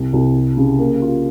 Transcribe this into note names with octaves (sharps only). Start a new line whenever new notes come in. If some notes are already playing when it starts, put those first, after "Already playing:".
Already playing: C2
C2
G3
C#3
A#3
F4